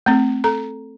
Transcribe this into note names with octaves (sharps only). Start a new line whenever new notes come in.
A3 C4
A4 A#5